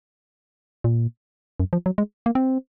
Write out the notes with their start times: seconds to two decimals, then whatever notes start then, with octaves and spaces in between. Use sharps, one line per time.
0.84 A#2
1.60 F#2
1.73 F3
1.86 F#3
1.98 G#3
2.26 A#3
2.35 C4